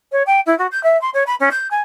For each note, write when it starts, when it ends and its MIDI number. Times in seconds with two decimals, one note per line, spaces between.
0.12 0.23 73
0.26 0.40 79
0.46 0.57 64
0.58 0.67 66
0.71 0.82 91
0.83 0.99 76
1.01 1.10 84
1.14 1.23 73
1.26 1.35 83
1.40 1.49 61
1.51 1.67 91
1.70 1.81 80